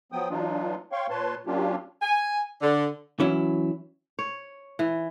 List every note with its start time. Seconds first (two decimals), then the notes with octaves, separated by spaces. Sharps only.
0.12 F3 F#3 B3 G5 D#6
0.30 E3 F#3 D4 D#4 F4
0.92 C#5 F5 G5 C6 C#6
1.10 A#2 B4 C#5 A5 C6
1.46 F#3 A#3 C#4 D4 F4 G4
2.02 G#5
2.61 D3
3.20 E3 F#3 C#4 E4
4.19 C#5
4.79 E3